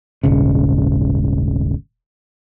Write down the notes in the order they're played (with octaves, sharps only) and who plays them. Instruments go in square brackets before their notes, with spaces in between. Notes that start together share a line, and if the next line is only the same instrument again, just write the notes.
[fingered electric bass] D#1 G#1 C#3